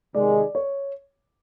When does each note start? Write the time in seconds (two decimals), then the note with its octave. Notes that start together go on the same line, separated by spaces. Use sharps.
0.14 C3 D#3 G#3 D5
0.55 C#5